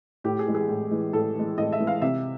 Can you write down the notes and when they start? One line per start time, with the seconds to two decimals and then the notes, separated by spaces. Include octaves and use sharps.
0.24 A2 G4
0.39 G#4
0.47 E3 G#3
0.55 G#4
0.69 A2
0.91 E3 G#3
1.13 A2 A4
1.35 E3 G#3
1.58 A2 D#5
1.73 E5
1.80 E3 G#3
1.87 F5
2.02 C3 E5